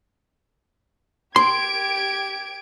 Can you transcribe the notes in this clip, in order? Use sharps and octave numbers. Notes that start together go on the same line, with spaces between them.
G4 C6 G#6 D7